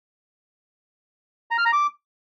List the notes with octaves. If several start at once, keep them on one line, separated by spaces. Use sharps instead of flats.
A#5
F6
A#5
D6